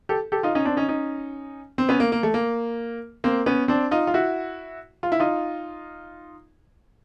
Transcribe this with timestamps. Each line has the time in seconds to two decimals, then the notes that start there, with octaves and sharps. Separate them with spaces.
0.09 G4 A4
0.32 G4 A4
0.43 D#4 F4
0.55 C#4 D#4
0.65 C4 D4
0.77 C#4 D#4
0.89 C#4 D#4
1.78 C4
1.89 B3 C#4
2.00 A#3
2.12 A#3
2.23 A3
2.34 A#3
3.24 A#3 C4
3.46 B3 C#4
3.68 C4 D4
3.91 D#4 F4
4.07 F4
4.14 E4 F#4
5.03 F4
5.12 E4
5.20 D#4 F4